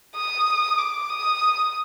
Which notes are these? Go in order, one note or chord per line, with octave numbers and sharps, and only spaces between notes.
D#6
D6
D#6